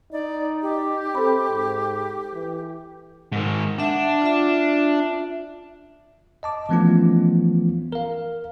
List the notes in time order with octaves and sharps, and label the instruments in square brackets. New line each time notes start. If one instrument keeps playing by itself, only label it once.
[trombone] D#4 [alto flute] D5
[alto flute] G4
[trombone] C4 [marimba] A4 B5
[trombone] G#2
E3
[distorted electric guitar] G#2 D#3
[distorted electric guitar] D4 [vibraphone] E5 F#5
[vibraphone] F4 E5
[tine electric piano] D#5 A5 D6
E3 F3 A3 B3 C#4 F4
A#4 F5